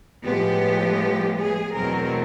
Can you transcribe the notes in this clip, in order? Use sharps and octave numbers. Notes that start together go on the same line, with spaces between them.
A2 F3 G#3 B3 G4
G#4
E2 B2 F#3 A3 C4 A#4